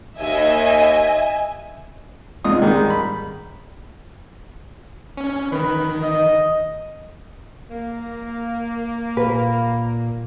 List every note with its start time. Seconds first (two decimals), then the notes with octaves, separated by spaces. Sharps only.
0.19 D#2 D#5 E5 G#5
2.44 C#2 G#2 D#4 F4 D#6
2.61 G#2 D#3 G3 G#3
2.90 B5
5.17 C#4
5.52 D#3 B4
6.03 D#5
7.70 A#3
9.17 A#2 B4